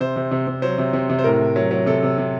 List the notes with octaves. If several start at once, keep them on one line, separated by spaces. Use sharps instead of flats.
C3 C5
C3
C3
C3
F#3 C5
C3
C3
C3
C5
A2 A#4
A2
F#3
F#3
C3 A4
C3
C3